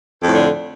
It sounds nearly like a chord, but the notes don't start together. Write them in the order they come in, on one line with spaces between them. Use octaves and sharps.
F2 A2 D3